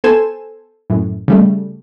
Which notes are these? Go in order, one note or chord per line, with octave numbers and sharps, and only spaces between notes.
B3 A4 C5 G#5 E7
F#2 A2
C#3 G3 A3